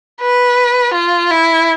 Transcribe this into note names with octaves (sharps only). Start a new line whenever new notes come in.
B4
F4
E4